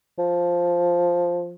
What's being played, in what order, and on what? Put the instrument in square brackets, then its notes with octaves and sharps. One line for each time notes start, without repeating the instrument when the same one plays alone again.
[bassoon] F3